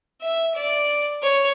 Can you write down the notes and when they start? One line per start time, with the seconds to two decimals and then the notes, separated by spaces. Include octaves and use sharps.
0.21 E5
0.55 D5
1.23 C#5